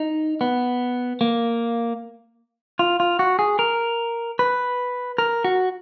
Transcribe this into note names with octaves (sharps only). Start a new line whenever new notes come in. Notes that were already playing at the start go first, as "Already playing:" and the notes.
Already playing: D#4
B3
A#3
F4
F4
F#4
G#4
A#4
B4
A#4
F#4